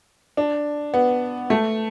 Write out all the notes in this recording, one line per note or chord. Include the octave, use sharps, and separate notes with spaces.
D4
B3
A3